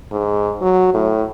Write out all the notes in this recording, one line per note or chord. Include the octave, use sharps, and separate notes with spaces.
G#2
F#3
A2